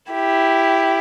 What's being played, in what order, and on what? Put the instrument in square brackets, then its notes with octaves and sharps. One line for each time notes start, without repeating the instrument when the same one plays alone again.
[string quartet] E4 G4